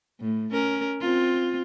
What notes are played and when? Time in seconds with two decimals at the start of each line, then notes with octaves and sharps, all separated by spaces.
0.20 A2
0.52 C#4 A#4
1.00 C4 F4